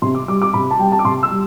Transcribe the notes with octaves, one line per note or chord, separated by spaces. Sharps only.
C3 C6
D6
G3 D6
D6
C3 B5
A5
G3 G5
A5
D6
C3 C6
E6
G3